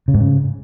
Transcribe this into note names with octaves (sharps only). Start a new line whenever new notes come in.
C#3
G#2
C#3